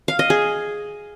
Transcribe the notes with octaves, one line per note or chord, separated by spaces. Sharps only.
F5
D#5
G#4